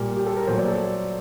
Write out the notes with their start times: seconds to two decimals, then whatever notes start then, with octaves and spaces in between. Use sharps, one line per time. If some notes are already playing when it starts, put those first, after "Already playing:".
Already playing: A#2 G3 A#3
0.17 G4
0.26 A4
0.37 A#4
0.47 A#2 F#3 A3 C5
0.58 D5
0.68 A4